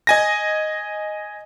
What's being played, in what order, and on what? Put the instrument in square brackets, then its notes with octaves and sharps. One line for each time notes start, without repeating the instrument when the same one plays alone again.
[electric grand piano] D#5 G#5 A#6